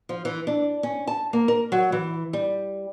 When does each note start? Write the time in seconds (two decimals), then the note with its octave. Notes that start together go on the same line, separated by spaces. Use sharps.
0.09 F3
0.25 E3
0.47 D4
0.83 C#4
1.07 A5
1.33 A#3
1.48 A#4
1.72 F#3
1.92 E3
2.33 G3